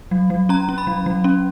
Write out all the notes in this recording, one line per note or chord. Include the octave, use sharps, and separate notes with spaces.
F#3
F#3
C#4 A#5
C#4
B5
F#3
F#3
C#4